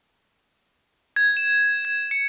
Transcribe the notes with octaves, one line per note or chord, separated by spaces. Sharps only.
G#6
E7
G#6
C#7